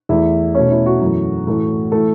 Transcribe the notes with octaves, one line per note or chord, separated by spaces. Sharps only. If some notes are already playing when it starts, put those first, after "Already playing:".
E2 E3 A3 E4 E5
B2 A3 C#4 C#5
E4
F#4
F#2 E3 A3
A2 E3 A3
E3 A3 A4